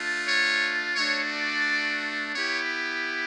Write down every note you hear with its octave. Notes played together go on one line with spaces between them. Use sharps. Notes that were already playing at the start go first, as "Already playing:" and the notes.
Already playing: A3 D4 F4
C#5
A3 D4 F#4 C#5
D5
B3 E4 G4 C#5